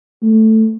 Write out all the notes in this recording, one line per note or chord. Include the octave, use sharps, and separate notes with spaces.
A3